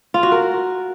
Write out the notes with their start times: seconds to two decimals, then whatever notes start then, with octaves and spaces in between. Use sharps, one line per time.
0.14 F4
0.23 F#4
0.32 A#4